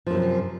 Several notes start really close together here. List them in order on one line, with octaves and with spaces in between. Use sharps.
F3 F#2 C3